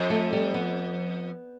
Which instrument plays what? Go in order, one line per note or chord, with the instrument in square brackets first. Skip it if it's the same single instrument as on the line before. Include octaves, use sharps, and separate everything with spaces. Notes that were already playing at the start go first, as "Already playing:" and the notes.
Already playing: [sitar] F2
[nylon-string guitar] A3
G3
B3